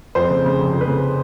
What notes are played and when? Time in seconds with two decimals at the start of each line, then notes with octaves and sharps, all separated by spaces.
0.15 F2 C5
0.30 C#3
0.45 C#3
0.58 F1
0.73 F2
0.81 B4
0.87 C#3